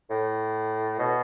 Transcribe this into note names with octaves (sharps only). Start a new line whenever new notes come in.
A2
B2